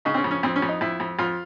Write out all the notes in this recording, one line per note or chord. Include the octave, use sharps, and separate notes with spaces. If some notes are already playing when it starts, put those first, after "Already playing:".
C#3 D#4
C4
C#4
F2
C#4
F2 C4
C#4
F2
D#4
F2 E4
F2
F2 F4